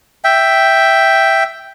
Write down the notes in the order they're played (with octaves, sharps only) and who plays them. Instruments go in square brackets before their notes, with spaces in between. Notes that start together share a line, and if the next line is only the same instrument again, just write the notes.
[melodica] E5 G5